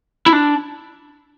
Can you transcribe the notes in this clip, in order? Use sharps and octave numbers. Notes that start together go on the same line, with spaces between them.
E4
D4